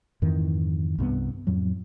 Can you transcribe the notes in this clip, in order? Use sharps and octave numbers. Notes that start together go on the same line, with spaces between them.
F2 G#2 D#3 E3
C2 G2 F#3 B3
F2 A2 F#3